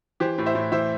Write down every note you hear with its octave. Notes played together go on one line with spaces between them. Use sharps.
E3 G4 C5
A2
C5 E5
A2
E3 C5 E5